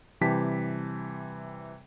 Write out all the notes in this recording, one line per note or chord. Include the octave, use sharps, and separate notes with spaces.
C3 E3 G3 G4 A5 B6